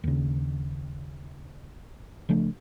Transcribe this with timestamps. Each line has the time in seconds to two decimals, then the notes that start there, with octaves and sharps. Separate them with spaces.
0.04 D#2 C#3
2.29 C#3 F3 A3 D4